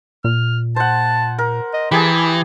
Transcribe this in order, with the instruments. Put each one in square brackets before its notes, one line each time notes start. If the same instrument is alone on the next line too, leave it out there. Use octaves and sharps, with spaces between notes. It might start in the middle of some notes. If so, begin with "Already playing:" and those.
[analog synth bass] A#2 [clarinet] F6
[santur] C5 F#5 [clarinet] A5
[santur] A#4
[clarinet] D#5
[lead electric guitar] E3 [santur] G4 G#4 A5 [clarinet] B5